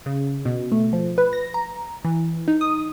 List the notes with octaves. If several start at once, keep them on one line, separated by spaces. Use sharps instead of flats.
C#3
B2
A3
F3
B4
A#6
A#5
E3
D#4
D#6